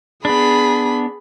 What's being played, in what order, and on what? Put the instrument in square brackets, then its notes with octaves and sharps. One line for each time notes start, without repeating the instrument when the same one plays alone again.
[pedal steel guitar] B3 D4 [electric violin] G#4 B5